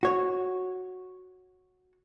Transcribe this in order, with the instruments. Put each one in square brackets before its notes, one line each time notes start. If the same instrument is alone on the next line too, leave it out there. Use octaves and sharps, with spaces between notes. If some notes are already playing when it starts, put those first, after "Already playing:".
[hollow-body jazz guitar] F#4 C#5